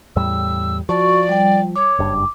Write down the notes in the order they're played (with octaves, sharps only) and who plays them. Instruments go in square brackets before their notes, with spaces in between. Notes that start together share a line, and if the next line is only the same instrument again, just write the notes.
[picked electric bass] E2 A2 G3 [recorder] E6
[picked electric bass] F3 [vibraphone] F#4 C#6 [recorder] D5
[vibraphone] G3 G5
[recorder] C#5 [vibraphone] D6
[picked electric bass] F#1 G2